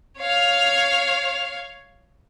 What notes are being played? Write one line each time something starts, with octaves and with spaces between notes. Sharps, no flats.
C#5 F5